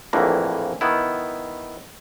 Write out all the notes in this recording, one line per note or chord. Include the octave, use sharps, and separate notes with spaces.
A#1 F2 A2 D3 E3 A#3
D#3 B3 E4